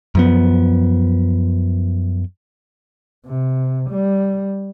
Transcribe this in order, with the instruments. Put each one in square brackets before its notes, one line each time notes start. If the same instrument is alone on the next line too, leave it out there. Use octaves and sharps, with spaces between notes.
[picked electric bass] F#2 F3 B3
[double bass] C3
G3